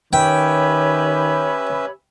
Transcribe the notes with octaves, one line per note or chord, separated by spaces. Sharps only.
D#3 C#4 G4 B4 C#5 E5 G5 B5